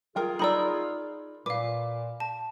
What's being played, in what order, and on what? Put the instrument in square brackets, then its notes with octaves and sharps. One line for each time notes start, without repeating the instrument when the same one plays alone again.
[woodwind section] F4 G#4 [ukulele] A#4 G5
[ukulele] D#4 A#4 D5 [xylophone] B5 E6
[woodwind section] A#2 [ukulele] B4 [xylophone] F5 D6
[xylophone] A5